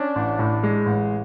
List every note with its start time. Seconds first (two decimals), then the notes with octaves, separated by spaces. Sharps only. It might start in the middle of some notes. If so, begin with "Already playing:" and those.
Already playing: C#4 D4
0.16 A1
0.39 A2
0.63 G#3
0.86 A1